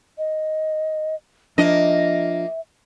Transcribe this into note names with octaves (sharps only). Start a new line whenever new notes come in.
D#5
F3 A#3 D4 D#5 E5